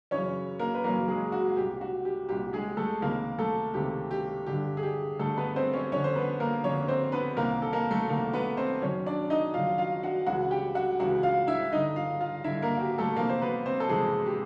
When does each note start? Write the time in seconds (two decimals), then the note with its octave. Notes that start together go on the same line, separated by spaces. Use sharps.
0.11 F#2 C#3 E3 C#4 C#5
0.59 A#3 A#4
0.74 B4
0.84 F#2 C#3 E3 A#3 A#4
1.08 G#3 G#4
1.32 F#4
1.57 C2 A#2 G4
1.81 F#4
2.05 G4
2.29 C2 A#2 G4
2.53 G#3 G#4
2.77 A3 A4
3.02 C#2 C3 D#3 A#3 A#4
3.38 A3 A4
3.74 C#2 C3 D#3 G4
4.11 G4
4.47 G2 D3 G4
4.77 G#4
4.83 G4
5.19 G2 D3 A3 A4
5.37 B3 B4
5.56 C4 C5
5.73 C#4 C#5
5.92 F2 D3 C#4 C#5
6.04 C5
6.15 B3 B4
6.40 A#3 A#4
6.64 F2 D3 C#4 C#5
6.88 C4 C5
7.12 B3 B4
7.36 C2 C3 D#3 A#3 A#4
7.62 A4
7.73 A#3 A#4
7.91 A3 A4
8.09 C2 C3 D#3 A#3 A#4
8.33 B3 B4
8.57 C4 C5
8.81 F#2 D#3 C#4 C#5
9.06 D4 D5
9.30 D#4 D#5
9.54 F#2 D#3 F4 F5
9.78 F4 F5
10.03 F#4 F#5
10.26 C#2 C#3 E3 F#4 F#5
10.51 G4 G5
10.75 F#4 F#5
11.00 C#2 C#3 E3 F#4 F#5
11.23 F4 F5
11.47 E4 E5
11.72 G2 D3 D#4 D#5
11.96 F4 F5
12.20 F4 F5
12.44 G2 D3 E4 E5
12.62 A#3 A#4
12.77 F#4
12.80 G4
12.98 A3 A4
13.16 F2 C3 E3 A#3 A#4
13.29 C5
13.41 B3 B4
13.66 C4 C5
13.80 A4
13.89 F2 C3 E3 G#3 G#4
14.26 G4